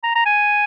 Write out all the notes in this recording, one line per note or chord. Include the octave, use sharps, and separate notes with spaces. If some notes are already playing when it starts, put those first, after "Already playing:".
A#5
A#5
G#5